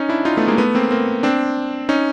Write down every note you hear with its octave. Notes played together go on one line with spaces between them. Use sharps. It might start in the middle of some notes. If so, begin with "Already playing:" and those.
Already playing: C#4 D#4
D4 E4
D#4 F4
A3 B3
G#3 A#3
A3 B3
A#3 C4
A#3 C4
C4 D4
C#4 D#4